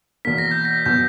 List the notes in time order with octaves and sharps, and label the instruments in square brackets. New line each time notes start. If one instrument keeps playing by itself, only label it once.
[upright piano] E2 B2 A#3 [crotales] B6
[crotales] A#6
G6
A#6
[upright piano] B2 F#3 B3 [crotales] G6